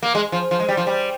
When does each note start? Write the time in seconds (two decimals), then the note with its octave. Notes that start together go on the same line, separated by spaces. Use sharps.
0.03 A#3
0.15 G#3
0.32 F3
0.51 F3
0.60 G#3
0.69 G3
0.77 F3
0.87 G3